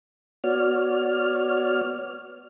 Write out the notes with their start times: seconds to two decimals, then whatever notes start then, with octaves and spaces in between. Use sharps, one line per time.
0.44 B3 F#4 C#5 D5 F6